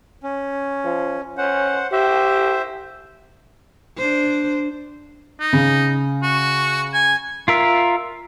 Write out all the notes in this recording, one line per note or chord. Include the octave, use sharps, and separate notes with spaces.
C#4
F3
C#4 C5 F#5
G4 C5 E5
D4 C5
D#4
C#3
F#4
G#5
F4 A#4 E5